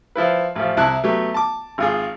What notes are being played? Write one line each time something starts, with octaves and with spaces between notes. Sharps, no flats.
F3 E4 B4
A1 F3
C2 E4 A5 F#6
F#3 A3 B3 G4
A5 D6
G#1 F4 G#4